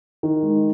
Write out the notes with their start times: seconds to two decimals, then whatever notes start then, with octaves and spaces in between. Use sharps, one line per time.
0.23 D#3
0.43 G#3